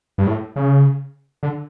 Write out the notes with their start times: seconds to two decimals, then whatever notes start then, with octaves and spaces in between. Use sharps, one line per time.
0.18 G2
0.27 A2
0.56 C#3
1.43 D3